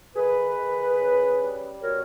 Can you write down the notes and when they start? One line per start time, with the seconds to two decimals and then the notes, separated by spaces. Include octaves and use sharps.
0.15 D#3 G#4 B4
0.57 D#3
0.98 C#4
1.41 G3
1.82 B2 A#4 C#5